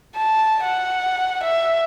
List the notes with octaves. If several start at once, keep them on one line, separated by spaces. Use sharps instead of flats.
A5
F#5
E5